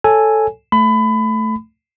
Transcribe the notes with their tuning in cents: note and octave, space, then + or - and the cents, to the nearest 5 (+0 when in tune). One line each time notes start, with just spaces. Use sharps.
A4 +0 C#5 +0 G#5 +0
A3 +0 B5 +25